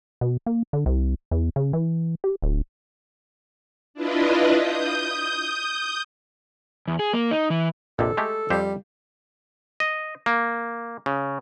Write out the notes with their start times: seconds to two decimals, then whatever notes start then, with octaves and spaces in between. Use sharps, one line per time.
0.21 B2
0.46 A#3
0.73 D3
0.86 C2
1.31 E2
1.56 C#3
1.73 E3
2.24 G4
2.42 D1
3.94 D4 E4 F4 B4 D#5
4.57 D#6 G6
6.88 E2
6.99 G#4
7.13 A#3
7.31 D#4
7.50 E3
7.99 A#1 F2 C3 A4
8.17 G#3 A3 G4
8.50 F2 G3 G4 C5
9.80 D#5
10.26 A#3
11.06 C#3